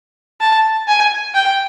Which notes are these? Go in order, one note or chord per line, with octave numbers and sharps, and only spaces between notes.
A5
G#5
G5